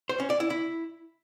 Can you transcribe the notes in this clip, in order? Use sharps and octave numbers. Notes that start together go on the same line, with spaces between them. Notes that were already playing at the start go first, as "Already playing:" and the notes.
C5
C#4
D5
E4
E4